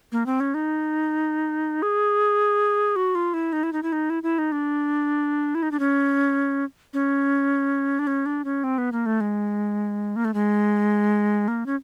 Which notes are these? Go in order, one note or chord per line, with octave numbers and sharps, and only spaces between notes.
A#3
C4
C#4
D#4
G#4
F#4
F4
E4
D#4
E4
D#4
E4
D#4
E4
E4
D#4
D4
E4
D#4
D4
C#4
C#4
D4
C#4
D4
C#4
C4
B3
A#3
A3
G#3
A#3
A3
G#3
A#3
C#4